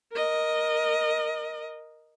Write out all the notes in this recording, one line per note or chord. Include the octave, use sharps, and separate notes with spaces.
A#4 D#5